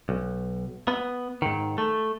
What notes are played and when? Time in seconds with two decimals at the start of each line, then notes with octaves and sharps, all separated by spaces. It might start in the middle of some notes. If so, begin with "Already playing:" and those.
0.09 B1
0.88 B3
1.42 G#2 D#3
1.78 A3